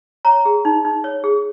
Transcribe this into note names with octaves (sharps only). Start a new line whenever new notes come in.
C#5 A#5
G#4
D#4
D#4
C#5
G#4